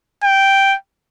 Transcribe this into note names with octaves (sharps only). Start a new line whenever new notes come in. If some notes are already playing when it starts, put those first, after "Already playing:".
G5